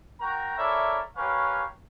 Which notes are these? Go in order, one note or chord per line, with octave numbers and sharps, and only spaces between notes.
F#4 A#4 G5 A#5
E4 A4 A#4 C#5 D5 E5
C#4 G4 A#4 B4 C#5 F5